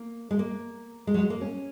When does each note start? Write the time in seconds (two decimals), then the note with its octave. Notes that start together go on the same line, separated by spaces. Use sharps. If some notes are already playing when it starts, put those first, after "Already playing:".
Already playing: A#3
0.31 G#3
0.39 A#3
1.07 G#3
1.14 F#3
1.19 G#3
1.30 A#3
1.41 C#4